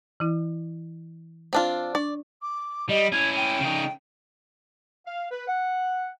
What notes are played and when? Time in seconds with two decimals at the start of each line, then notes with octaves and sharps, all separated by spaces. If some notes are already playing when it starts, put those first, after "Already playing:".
0.20 E3 E4
1.53 C4 D4 F4
1.95 D4 D5
2.42 D6
2.89 G3 D#5
3.12 C#4 E4 G#6
3.36 G5
3.60 C#3 D#4
5.06 F5
5.31 B4
5.48 F#5